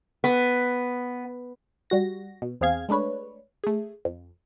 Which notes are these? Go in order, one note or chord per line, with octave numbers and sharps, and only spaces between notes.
B3
G3 F#4 A#6
B2
E2 C4 G#4 F5 G#6
G#3 A3 D4 B4 C#5
A3 G#4
F2